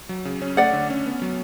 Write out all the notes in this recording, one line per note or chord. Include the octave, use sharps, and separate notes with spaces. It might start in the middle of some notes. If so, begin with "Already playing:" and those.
F#3
C#3
C#4
A3 D5 F#5
D3
C#4
B3
F#3